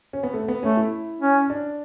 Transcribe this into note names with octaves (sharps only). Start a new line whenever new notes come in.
C#4
B3
A3
B3
A3 C#4
E4
C#4
D4